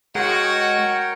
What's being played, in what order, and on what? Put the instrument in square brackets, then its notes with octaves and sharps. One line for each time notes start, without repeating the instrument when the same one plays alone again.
[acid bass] G#3 [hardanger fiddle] F#4 F#5 [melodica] A#4 C#5 G5